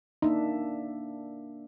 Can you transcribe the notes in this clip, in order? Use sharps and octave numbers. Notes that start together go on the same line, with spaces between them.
A#3 D4 D#4 E5